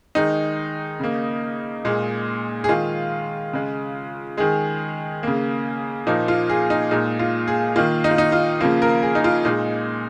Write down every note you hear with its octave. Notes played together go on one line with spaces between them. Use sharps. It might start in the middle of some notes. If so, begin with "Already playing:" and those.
D#3 G#3 D#4
C#3 A#3
A#2 G#3
G#4
D#3 G#3 F4
C#3 G#3
D#3 G#3 G#4
C#3 A#3
A#2 F3 A#3 D#4
F4
G#4
D#4
A#2 G#3 D#4
F4
G#4
D#3 A#3 F4
D#4
F4
D#4
F4
C#3 F3 A#3 F4
A#4
G#4
D#4
F4
A#2 G#3 D#4